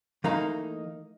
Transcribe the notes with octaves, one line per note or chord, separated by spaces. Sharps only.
E3 A3 A#3 D#4 F5 A#5